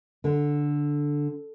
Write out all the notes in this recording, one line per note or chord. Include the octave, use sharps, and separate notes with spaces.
D3